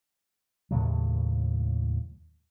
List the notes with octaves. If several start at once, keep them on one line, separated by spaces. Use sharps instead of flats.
D#2 A2 C#3 F#3